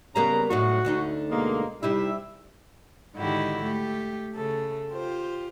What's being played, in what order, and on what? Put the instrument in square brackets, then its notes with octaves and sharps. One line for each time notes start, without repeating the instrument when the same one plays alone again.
[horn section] C#3 A#5 [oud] G3 A#3 B3
[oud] A2 F#3 D#4 [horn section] F#4
[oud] D2 D3 D#4
[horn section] B2 G#3 A#3
[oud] C3 D#4 E4 [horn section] G3 E5
[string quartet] G#2 D3 D#3 E4 F#4 G4
A3 G4
C#3 A3 A4
F4 G4 C5